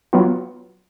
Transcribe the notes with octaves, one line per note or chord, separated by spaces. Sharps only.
F#3 B3 F4